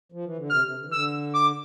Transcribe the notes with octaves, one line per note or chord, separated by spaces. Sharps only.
F3
E3
D3
C3 F6
C3
D3
E3
D3 E6
D6